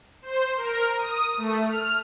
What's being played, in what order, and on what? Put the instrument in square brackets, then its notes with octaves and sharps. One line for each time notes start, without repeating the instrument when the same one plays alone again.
[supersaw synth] C5
A#4
D#6
A3
F6